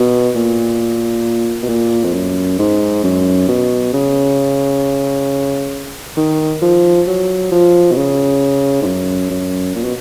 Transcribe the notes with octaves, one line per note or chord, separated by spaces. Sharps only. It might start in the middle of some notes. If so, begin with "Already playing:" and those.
Already playing: B2
A#2
B2
A#2
F2
F#2
G#2
F#2
B2
C#3
D#3
F3
F#3
F3
B2
C#3
G#2
F#2
F#2
A#2
B2